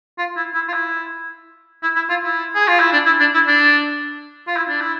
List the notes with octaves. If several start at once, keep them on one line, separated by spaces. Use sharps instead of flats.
F4
E4
E4
F4
E4
E4
E4
F4
E4
G#4
F4
E4
D4
E4
D4
E4
D4
F4
E4
D4
E4